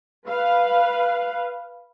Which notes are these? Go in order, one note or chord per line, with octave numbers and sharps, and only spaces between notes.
B4 F5